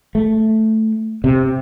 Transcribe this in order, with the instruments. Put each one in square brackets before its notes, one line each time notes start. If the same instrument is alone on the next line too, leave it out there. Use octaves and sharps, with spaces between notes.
[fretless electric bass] A3
C3